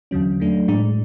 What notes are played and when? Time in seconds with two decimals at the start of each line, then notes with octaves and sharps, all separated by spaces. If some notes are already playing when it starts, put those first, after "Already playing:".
0.11 E2 D3 F#3 C#4
0.40 F#3 A3 D4
0.68 A2 G#3 D4